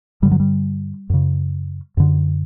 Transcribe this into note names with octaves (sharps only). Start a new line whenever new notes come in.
G2 D3 G3
F#3
G3
F#2 C#3
F#2 D3